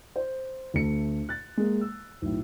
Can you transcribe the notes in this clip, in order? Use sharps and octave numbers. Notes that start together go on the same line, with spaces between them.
C5
D2 A3 C#7
F#6 A6
G#3 A#3
E6
B1 A2